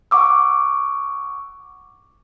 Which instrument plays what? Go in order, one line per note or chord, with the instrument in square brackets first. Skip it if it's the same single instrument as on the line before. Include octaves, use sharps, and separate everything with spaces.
[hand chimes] F#5 C#6 D6 E6